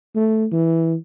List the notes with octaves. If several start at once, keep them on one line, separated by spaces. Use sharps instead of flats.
A3
E3